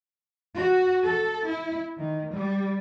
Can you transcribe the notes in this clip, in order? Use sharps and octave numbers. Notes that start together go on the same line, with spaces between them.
F#4
A4
E4
D#3
G3